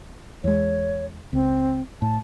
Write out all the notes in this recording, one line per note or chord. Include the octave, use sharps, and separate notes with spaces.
E2 G#3 C#5
C#2 C4
A2 A5